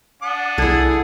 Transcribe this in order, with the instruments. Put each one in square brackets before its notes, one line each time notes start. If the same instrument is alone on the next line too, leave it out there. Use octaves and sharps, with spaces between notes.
[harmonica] D4 F#5 D#6
[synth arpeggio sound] C2 G#6 [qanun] E4 A4 [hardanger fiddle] G#4